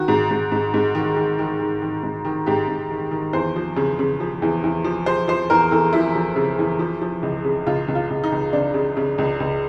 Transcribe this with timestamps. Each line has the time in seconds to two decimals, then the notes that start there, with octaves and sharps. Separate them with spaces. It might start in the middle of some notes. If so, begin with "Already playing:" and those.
Already playing: D#3 F#4
0.08 G#2
0.31 G#2
0.52 G#2
0.74 G#2
0.95 D#3
1.17 D#3
1.39 D#3
1.60 D#3
1.82 D#3
2.03 G#2
2.25 D#3
2.46 G#2 G4
2.68 G#2
2.91 D#3
3.11 D#3
3.33 E2 C5
3.56 F3
3.76 C#3
3.99 C#3
4.20 F3
4.42 E2
4.64 E2
4.84 F3
5.06 F3 C5
5.28 F3 C5
5.50 E2 A#4
5.71 E2 A4
5.93 F3 E4
6.16 F3
6.36 C#3
6.59 E2
6.79 F3
7.01 F3
7.23 C#2
7.44 C#3
7.67 C#2 F4
7.88 C#2
7.95 F4
8.10 C#2
8.24 D#4
8.32 C#2
8.53 C#2 D4
8.74 C#3
8.97 C#3
9.18 C#2
9.40 C#2